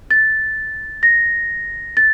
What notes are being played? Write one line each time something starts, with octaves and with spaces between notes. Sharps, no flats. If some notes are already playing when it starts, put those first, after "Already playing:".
A6
A#6
A6